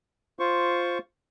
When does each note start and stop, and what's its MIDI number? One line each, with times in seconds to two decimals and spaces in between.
0.39 0.98 65
0.39 0.98 72
0.39 0.98 85